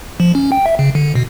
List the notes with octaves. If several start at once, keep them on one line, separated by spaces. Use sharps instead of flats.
F3
C#4
G5
E5
C#3
D3
B2